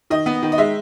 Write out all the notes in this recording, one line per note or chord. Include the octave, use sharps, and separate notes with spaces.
D#3 D#5
B3
D#3
D#5
G#3 E5